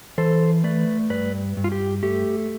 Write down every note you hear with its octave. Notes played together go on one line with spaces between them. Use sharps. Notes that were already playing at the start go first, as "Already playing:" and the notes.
E3 A4 C5
A3 B4 D5
G2 B4 D5
G2
F4
G4
A3 G4